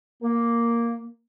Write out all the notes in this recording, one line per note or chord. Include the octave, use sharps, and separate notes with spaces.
A#3